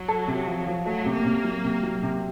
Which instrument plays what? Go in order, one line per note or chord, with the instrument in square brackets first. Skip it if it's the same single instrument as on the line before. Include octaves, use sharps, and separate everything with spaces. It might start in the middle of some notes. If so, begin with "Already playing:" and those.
Already playing: [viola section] F#3
[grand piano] A4
C3
F3
F3
[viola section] F#3 [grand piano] A3
[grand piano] C3
[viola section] A#3
[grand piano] C3
F#3
C3
F#3
C3